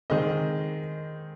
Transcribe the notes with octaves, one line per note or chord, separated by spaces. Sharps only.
D#3 G#3 C4 D#5